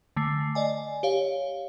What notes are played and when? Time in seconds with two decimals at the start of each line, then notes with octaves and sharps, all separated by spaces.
0.16 D3 A3 C7
0.55 D5 D#5 G#5
1.03 G4 C#5 F5